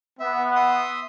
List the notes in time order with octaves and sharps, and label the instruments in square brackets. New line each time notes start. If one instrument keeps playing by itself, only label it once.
[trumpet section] B3 [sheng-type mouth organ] E5
[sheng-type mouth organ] E5 C6 D#6